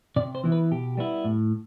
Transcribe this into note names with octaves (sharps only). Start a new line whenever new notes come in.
C3 D5
C5
E3 B3 E4
B4
B2 G4
G3 B3 E4
A2